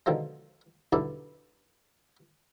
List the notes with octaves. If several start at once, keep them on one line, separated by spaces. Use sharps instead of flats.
B2 D3 D#3 F3 G#3
B1 G2 D3 E4 D5